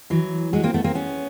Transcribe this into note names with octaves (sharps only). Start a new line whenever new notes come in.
E3 F#3
F#3 G#3
A#3 C4
A3 B3
A#3 C4
B3 C#4